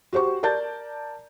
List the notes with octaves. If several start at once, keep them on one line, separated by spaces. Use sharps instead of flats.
F#4 G4 C5 C#6
A#4 D5 A5 G6 A6